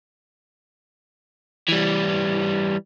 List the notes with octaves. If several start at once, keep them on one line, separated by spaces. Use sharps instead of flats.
E3 G3